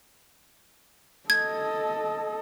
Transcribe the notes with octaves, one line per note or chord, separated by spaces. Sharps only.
A4 D#5 G#6